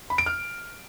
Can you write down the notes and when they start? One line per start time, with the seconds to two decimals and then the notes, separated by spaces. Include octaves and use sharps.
0.10 B5
0.18 D7
0.26 F6